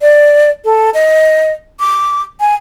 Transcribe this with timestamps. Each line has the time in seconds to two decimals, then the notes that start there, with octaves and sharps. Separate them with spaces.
0.01 D5
0.65 A4
0.94 D#5
1.80 D6
2.40 G#5